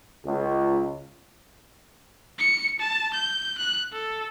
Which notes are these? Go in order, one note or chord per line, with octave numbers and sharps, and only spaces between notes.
C#2
C#7
A5
G6
F#6
A4